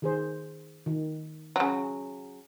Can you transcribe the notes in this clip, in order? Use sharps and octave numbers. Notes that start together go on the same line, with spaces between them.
D#3 G#4 C5
D#3
C#3 F#3